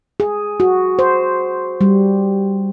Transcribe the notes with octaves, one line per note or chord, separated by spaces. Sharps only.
G#4
F#4
C5
G3